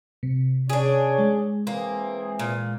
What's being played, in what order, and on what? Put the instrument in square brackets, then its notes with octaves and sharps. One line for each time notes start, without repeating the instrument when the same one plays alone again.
[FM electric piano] C3
[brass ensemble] C#4 C#5 [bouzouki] D4 G#4
[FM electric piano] G#3
[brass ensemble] E3 C4 G#4 [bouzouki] A#3
[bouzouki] A#2